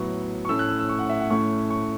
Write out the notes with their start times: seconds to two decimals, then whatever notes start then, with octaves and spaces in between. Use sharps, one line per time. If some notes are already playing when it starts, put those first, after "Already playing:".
Already playing: A2 F#3 B3 C#6
0.45 C#6
0.49 A2 A3 C#4 E6
0.59 F#6
0.69 E6
0.79 E6
0.89 C#6
0.99 F#5
1.09 E5
1.20 F#5
1.30 A2 A3 C#4 C#6
1.70 C#6